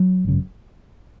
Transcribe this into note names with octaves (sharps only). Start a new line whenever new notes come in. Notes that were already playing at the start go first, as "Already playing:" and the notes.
Already playing: F#3
G#1 F#2 C#3